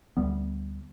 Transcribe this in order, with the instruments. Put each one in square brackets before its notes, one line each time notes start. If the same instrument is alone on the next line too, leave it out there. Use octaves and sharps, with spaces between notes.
[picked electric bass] D2 G3 B3